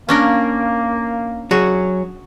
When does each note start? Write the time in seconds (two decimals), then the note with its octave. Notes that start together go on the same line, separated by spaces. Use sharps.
0.09 A#3 C#4 D4 A#4
1.51 F#3 F#4 G#4